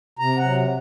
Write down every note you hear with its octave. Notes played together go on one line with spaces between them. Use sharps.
C3 A#5
F#5
F#3